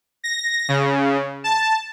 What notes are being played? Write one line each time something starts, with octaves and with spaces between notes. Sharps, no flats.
A#6
C#3
A5